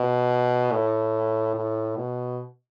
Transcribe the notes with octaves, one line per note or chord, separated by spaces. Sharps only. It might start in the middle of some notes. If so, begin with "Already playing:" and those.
Already playing: B2
A2
A2
B2